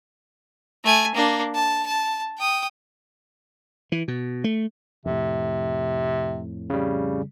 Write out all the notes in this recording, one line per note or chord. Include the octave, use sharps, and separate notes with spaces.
A3 G#5
A#3 D4
A5
A5
G5 D#6
E3
B2
A3
F2 A2 C3
C#3 G3